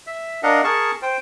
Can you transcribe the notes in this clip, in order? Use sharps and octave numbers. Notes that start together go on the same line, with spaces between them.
E5
D4 A#4 D#5 F5 F#5
G#4 A#4 A5 C#6
C5 G5